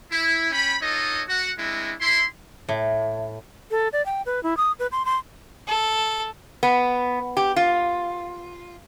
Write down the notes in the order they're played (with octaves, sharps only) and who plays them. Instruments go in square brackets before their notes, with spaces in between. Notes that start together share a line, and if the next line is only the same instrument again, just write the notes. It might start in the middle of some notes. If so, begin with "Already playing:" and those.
[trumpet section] E4
C#4 G5 B5
D#4 F4 A4 C#5 D#5
F#4 F#5
G#3 C4 D4 E4
E4 C6
[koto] A2
[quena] A4
D5
G5
B4
E4
D#6
B4
C6
C6
[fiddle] A4
[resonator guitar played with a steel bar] B3
G4
F4